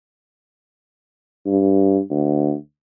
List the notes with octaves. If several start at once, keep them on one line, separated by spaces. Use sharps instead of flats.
G2
D2